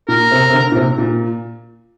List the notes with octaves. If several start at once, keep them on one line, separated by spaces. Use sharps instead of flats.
A#2 A#4
C3
C3
D3
A#2
C3
A#2